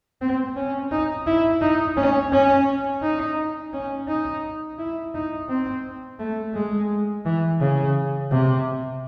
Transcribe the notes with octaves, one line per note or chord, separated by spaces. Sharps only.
C4
C#4
D#4
E4
D#4
C#4
C#4
D#4
C#4
D#4
E4
D#4
C4
A3
G#3
E3
C#3
C3